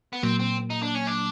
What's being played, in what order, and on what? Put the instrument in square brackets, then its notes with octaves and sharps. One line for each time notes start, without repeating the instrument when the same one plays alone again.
[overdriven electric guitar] B3
[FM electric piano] A#2 F#3 A#3 [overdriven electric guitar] C4
[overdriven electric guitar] C4
D#4
D4
C#4
D4